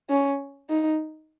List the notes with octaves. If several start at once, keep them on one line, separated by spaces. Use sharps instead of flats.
C#4
D#4